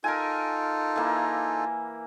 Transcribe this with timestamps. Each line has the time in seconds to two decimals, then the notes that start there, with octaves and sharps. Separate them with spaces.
0.04 D#4 F4 A4 A#4 G#5
0.96 E3 A#3